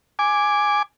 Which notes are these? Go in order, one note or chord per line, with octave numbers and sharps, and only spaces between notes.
G#5 D6